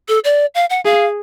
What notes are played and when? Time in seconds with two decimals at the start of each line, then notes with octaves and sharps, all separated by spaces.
0.08 A4
0.24 D5
0.55 F5
0.70 F#5
0.85 G#4 F5